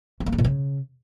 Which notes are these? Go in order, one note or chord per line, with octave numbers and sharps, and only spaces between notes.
A3
A#3
D3
A#2
C#3